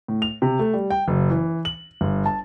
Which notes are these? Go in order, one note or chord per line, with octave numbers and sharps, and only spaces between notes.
A2
F7
C3
A3
G3
G5
F#1
E3
F#7
G1
A5